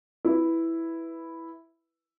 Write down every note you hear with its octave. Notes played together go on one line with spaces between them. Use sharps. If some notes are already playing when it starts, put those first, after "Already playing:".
E4 B4